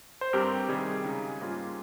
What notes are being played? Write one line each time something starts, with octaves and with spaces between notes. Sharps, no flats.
C5
G2 G3 C4 G4 A#4
C3 D#3 G3 G#4
C#3 G#3 D#4
G#2 G3 A#3 C#4 F4